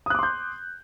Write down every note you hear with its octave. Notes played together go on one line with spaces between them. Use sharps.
C6 D6 D#6 F#6 G6